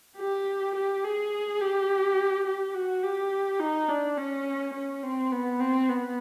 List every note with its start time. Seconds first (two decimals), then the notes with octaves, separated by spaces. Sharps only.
0.18 G4
0.75 G4
1.04 G#4
1.61 G4
2.46 G4
2.74 F#4
3.03 G4
3.60 D#4
3.89 D4
4.17 C#4
4.74 C#4
5.03 C4
5.32 B3
5.60 C4
5.89 B3